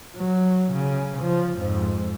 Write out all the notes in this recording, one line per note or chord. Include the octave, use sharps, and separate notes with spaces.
F#3
C#3
F3
F2 G#2